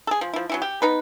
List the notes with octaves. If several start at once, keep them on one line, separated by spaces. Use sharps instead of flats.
G#4 A4
F3
F3 E4
F#3 C#4 E4
G4
B3 D#4 B4